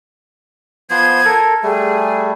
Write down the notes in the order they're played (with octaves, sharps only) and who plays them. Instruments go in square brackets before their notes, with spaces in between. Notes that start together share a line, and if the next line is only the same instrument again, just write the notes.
[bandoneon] F3 B3 C5 [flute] G#6
[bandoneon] A4 A#4
[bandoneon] G3 A3 [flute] G#4